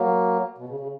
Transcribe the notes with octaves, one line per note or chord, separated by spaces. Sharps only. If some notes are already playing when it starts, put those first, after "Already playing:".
Already playing: F#3 A#3
B2
C#3
C#3